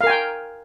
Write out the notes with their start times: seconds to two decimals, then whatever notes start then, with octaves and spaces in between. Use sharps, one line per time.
0.01 F5
0.04 A#4
0.07 G#5
0.10 G5